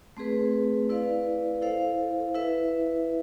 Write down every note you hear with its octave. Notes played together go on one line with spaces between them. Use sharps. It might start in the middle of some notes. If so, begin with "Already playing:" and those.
A3 C4 G#4 B4
E4 B4 D5 F5
E4 A4 C5 F5
E4 B4 E5